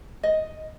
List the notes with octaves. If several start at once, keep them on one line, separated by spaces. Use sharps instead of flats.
D#5